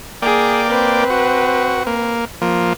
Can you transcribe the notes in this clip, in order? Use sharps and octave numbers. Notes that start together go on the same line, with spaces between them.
A#3 G#4 D5 G5
C4 B4
F#4
A#3
F3 A#3